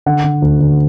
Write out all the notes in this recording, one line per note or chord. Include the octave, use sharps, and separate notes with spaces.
D3 F#5
D3
D2
D2